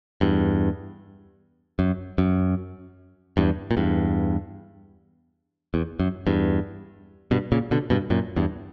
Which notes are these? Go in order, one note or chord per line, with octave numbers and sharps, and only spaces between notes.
E2 G2
F#2
F#2
E2 G2
A#2
E2 G2
E2
F#2
E2 G2
G2 B2
A#2 C#3
B2 D3
G2 B2
F#2 A#2
E2 G2